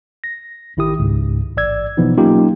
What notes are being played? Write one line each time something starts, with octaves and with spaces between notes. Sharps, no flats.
A#6
A1 D#3 E4 G4 D#6
C#2 G#2
A1 D5 E6 G#6
B2 E3 F3 B3 D#4
F#3 A#3 C#4 D#4 F4 G4